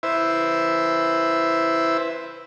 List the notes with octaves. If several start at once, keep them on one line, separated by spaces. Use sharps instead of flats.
E4 B4 C5 E5